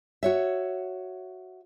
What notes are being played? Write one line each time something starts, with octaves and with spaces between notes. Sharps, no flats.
F#4 C#5 E5